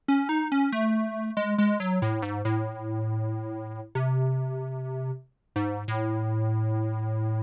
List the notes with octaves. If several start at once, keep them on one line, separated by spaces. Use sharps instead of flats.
C#4
D#4
C#4
A3
G#3
G#3
F#3
A2
G#2
A2
C3
G#2
A2